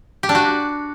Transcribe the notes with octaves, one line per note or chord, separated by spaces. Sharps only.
G4
D4
F#4